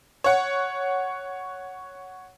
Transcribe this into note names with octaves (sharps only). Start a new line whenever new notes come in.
C#5 F#5